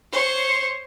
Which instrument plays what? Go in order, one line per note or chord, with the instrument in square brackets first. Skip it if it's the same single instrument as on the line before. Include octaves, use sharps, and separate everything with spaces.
[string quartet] C5 C#5